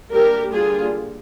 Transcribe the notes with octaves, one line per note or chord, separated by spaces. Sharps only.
G3 A#3 D4 G4 A#4
D3 G3 A#3 D4 F4 G#4